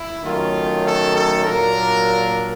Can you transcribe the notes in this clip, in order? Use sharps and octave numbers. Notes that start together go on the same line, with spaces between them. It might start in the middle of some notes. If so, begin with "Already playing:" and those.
Already playing: E4
D#3 F#3 A3 C#4 F4
A4
A4
A#2 F#3 A#3 D4 A#4